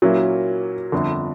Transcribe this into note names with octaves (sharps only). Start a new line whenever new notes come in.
A#2 F#3 A#3 C#4 E4
G1 F2 D3